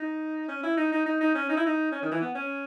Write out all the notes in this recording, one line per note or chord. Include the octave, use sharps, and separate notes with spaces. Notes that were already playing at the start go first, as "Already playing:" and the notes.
Already playing: D#4
C#4
E4
D#4
D#4
D#4
D#4
C#4
D#4
E4
D#4
C#4
D#3
E3
B3
C#4